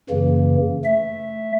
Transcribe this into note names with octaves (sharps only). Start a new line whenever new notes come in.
F#2 C#3 E3 A#3
A3 E5